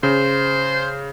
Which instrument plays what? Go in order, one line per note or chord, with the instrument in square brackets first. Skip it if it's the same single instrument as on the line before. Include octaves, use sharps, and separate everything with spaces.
[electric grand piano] C#3 [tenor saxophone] C5